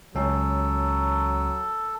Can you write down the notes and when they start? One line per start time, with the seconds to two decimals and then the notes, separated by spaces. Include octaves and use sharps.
0.15 C#2 F#3 C#4 A4